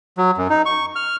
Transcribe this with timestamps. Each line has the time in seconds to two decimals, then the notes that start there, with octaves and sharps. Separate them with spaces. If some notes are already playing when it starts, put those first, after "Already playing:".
0.18 F#3
0.38 F#2
0.50 D#4
0.66 C#6
0.96 F6